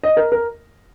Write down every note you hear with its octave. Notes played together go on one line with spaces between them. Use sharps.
D#5
A#4
A#4